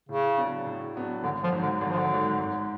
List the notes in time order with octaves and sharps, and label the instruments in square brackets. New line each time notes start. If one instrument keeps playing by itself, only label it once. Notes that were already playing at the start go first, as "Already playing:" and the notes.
[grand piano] A2 [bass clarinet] C#3
[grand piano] F#3 B3 D4
A2
F#3 B3 D4
[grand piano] G#1 [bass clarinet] D3
[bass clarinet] F3
[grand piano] G#2 F#3
[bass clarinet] D3
[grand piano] G#1 [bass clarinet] D3
[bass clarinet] F3
D3
[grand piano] G#2 F#3
G#2